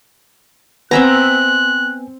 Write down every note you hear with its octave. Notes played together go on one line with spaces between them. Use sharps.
B3 C4 E5 G#5 A#5 F#6